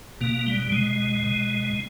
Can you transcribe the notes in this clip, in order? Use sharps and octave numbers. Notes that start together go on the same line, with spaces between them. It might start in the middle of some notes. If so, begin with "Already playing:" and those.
B2 A#3
G3
G3
B2 G#3
B2